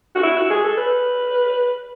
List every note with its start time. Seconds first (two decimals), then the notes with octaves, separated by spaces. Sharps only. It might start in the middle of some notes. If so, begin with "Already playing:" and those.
0.15 F#4
0.23 E4
0.36 F#4
0.50 G#4
0.64 A4
0.77 B4